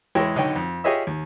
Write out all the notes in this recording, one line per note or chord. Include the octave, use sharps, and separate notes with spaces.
E2 G#3 E4 C#5 G5
B1 D3 D#4 C#5 G5
F2
F4 G4 G#4 C#5 D#5 E5
D#2